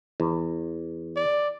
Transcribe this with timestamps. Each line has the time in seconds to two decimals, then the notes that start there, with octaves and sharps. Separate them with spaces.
0.20 E2
1.16 D5